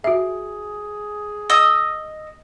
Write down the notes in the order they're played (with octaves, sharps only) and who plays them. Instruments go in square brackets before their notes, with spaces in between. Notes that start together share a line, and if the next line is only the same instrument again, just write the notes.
[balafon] F#4 E5 [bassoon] G#4
[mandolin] D#5 D#6 E6